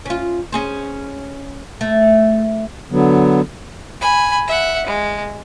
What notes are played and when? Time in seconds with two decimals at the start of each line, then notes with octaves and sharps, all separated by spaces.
0.06 C#4 F4
0.52 C#4 G#4 C5
1.81 A3
2.91 D3 F#3 B3
4.01 G#5 B5
4.48 E5 F#5
4.87 G#3